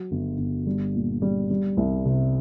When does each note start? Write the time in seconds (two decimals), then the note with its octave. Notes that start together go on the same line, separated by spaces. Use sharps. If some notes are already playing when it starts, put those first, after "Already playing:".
Already playing: F#3
0.11 G1
0.38 G1
0.67 G3
0.95 A#2
1.22 G3
1.51 G3
1.77 C2
2.05 C3